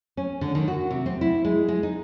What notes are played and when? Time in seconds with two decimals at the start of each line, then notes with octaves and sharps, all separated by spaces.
0.17 C#4
0.41 D3
0.55 D#3
0.68 F#4
0.91 C3
1.06 C4
1.21 E4
1.45 G#3
1.69 G#3
1.83 D#4